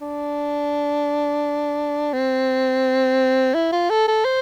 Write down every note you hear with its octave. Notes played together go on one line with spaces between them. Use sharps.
D4
C4
E4
F4
A4
A4
C5